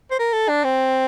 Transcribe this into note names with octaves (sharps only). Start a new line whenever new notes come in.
C5
A#4
A4
D4
C4